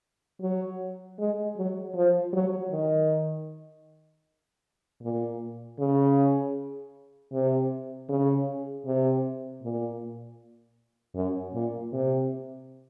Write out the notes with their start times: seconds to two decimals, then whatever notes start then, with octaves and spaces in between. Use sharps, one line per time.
0.41 F#3
1.18 G#3
1.57 F#3
1.95 F3
2.33 F#3
2.72 D#3
5.02 A#2
5.79 C#3
7.32 C3
8.09 C#3
8.86 C3
9.62 A#2
11.15 F#2
11.54 A#2
11.92 C3